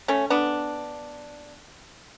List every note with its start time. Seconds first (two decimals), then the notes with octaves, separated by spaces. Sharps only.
0.08 A3 C#4
0.30 B3 D4